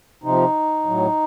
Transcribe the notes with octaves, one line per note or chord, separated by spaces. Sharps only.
C3 F3 D#4
A2 F#3